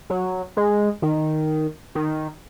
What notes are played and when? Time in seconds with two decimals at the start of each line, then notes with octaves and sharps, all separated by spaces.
0.10 F#3
0.57 G#3
1.02 D#3
1.95 D#3